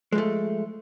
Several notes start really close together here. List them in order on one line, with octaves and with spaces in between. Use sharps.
G#3 F3 A3